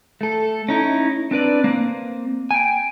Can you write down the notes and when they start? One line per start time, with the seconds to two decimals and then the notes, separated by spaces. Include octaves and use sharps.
0.21 A3 A4
0.69 C#4 D#4 E4
1.31 C4 D4 B4 D5
1.64 A#3 C4
2.51 G5 G#5